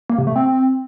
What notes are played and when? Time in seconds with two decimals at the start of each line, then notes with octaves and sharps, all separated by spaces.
0.10 A#3
0.18 C3
0.27 A3
0.36 C4